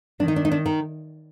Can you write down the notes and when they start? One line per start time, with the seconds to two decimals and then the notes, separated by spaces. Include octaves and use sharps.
0.20 D#3 D4
0.28 D#4
0.36 D4
0.45 D#4
0.52 D4
0.66 D#3